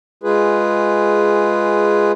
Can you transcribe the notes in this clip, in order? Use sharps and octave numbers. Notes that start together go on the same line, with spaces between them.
G#3 F4 G#4 B4